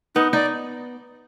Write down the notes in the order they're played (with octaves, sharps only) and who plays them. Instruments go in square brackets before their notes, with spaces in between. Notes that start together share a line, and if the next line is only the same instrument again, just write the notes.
[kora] B3 [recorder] D#4
[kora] D#4 [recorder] D5